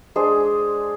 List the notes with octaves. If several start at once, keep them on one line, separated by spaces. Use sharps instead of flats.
G#3 D4 G#4 C5